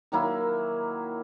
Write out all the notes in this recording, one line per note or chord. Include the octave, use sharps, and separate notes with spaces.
D#3 F#3 A#3 E4